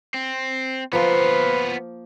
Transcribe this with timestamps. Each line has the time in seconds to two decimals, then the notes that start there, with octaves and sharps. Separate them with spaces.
0.14 C4
0.93 F3 A#3 B3 F4 B4